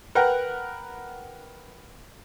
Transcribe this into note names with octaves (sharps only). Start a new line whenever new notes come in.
A#4 B4 F#5 G5 A#5